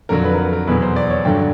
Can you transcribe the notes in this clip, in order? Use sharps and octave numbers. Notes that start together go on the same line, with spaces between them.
F2 D3 F#3 A#4
B4
A#4
B4
A#4
E2 B2 F#3 B4
C5
D5
C#5
G2 D3 F#3 G5